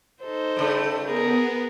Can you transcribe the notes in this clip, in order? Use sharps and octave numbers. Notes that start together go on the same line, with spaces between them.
D#4 A4 C5
G2 C#3 A3
B3 G#4 A#4